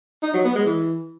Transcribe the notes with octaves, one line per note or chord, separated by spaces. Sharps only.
D#4
F#3
B3
G#3
E3